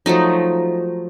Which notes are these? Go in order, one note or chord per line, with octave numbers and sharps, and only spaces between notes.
F3 F#3 A3 D#4